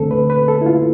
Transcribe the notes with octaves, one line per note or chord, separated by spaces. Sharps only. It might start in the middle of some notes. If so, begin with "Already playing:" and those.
Already playing: D2 D3 A3 C4 A4
B4
B4
A4
E4
F4